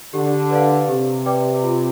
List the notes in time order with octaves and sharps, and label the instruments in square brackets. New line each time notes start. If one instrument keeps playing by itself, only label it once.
[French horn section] D3 [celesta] G4
[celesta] B4 D5 F5
[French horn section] C3 [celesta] G4
[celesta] B4 D5 G5 D6
F4